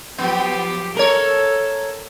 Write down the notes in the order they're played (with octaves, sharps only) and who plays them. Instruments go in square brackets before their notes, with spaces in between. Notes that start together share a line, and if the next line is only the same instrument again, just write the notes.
[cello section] F3 F#3 G4 [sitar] B3
[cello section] A4 [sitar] A#4 C#5